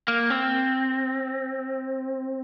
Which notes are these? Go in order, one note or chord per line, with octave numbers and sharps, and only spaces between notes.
A#3
C4